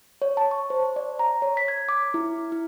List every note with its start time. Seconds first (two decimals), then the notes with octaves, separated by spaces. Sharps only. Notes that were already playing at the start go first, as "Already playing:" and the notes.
0.22 C#5
0.37 A5
0.51 C#6
0.70 C5
0.96 D5
1.19 A#5
1.42 C#5
1.57 B6
1.68 G#6
1.89 D6
2.14 E4
2.52 E4